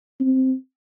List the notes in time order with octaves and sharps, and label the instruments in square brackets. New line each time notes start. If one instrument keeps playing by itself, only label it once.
[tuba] C4